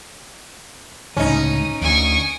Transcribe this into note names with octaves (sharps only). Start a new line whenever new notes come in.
C#2 A2 D3 C#4 D#4 A#5 D#7
D2 G#5 C#6 D#6 D7